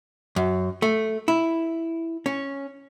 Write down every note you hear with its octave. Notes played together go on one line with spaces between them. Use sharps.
F#2
A3
E4
C#4